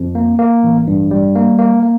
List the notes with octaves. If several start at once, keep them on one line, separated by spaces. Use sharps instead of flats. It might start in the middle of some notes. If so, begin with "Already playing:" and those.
Already playing: F2
A#3
A#3
A1
G2
G3
A#3
A#3
A#3